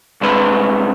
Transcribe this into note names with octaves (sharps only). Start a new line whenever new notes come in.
C2 G#3 B4